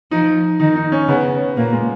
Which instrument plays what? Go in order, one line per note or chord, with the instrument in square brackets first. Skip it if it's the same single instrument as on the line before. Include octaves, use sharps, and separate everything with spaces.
[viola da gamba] F3 [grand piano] D#4
[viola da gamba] D#3 [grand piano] D#4
[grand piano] D#4
C#4
[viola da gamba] C#3 [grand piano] B3
[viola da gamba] A#2 [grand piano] A#3
[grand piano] G#3